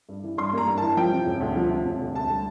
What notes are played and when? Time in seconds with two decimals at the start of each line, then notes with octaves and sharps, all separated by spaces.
0.09 G2
0.24 E3
0.38 G2 C6
0.53 A#3 A#5
0.67 G2
0.78 A5
0.82 E3
0.97 F3 G5
1.12 C3
1.26 E1
1.41 D2
1.56 F3
1.71 C3
1.85 E1
2.00 D2
2.15 D2 A5
2.30 G3